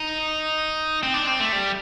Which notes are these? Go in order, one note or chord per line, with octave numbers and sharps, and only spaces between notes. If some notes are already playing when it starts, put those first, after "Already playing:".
Already playing: D#4
C4
D4
C4
A3
G3